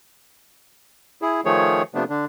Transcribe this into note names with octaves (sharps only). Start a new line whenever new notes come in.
E4 G#4
D#3 F3 A3 G#4 C#5
C3 F3 A3 B3 D4
D3 D4